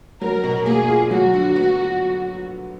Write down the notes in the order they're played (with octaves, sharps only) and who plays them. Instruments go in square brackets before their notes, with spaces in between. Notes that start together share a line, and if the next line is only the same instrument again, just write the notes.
[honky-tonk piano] F#3 [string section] A#4
[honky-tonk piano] B2
[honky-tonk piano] A#3 [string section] G#4
[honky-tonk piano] F4
[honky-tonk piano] F#3 [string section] F#4
[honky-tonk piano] D3
B3